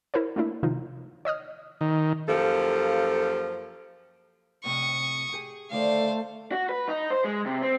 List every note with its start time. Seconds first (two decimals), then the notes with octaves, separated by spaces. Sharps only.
0.14 E4 A#4 C5 C#5
0.36 A3 A#3 D4 E4
0.63 C3 D#3 F3 D#4 F4
1.25 C#5 D#5 D#6 F6
1.81 D#3
2.29 F#2 F3 A#3 G4 A4
4.64 F2 A2 C3 C#6 D#6
5.32 G4 G#4 G#5
5.71 D2 D#3 A3 C5 D5 F5
6.52 F#4
6.69 B4
6.88 D#4
7.10 C5
7.25 G#3
7.46 C3
7.62 C4